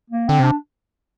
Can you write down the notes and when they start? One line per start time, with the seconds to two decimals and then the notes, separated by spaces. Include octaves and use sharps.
0.10 A#3
0.28 D3 C4
0.39 C3 D4